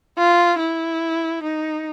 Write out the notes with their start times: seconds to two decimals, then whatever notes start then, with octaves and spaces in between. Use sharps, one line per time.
0.18 F4
0.59 E4
1.43 D#4